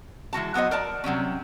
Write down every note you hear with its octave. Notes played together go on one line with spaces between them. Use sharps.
E3 G#3 F#4 A5
F#3 B3 F#4 C5 D#5
A#4 D5 A5
C3 F#3 G3 C#4